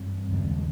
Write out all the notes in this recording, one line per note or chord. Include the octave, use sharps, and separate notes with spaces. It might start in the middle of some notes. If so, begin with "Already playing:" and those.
Already playing: G2 G3 C4
D#2 C#3 F3 G#3